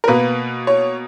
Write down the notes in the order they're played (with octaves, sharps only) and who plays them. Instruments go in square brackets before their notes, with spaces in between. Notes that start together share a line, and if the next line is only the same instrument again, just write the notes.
[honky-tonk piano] A#4
B2 A#3 B4
C#5